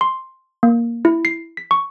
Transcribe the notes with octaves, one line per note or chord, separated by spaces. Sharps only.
C6
A#3
E4
C7
B6
C#6